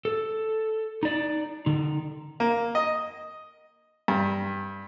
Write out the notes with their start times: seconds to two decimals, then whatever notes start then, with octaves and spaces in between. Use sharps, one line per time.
0.05 A4
1.03 D#4 D5
1.66 D3 D#4
2.40 A#3
2.75 D#5
4.08 G2